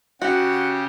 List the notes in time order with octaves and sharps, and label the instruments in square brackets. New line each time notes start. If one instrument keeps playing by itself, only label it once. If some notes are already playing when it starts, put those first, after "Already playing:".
[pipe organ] C#3 G4 [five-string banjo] F#4 [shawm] F#5